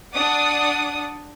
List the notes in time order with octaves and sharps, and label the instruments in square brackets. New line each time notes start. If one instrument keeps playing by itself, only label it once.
[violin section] D4 D5 F#5 D#6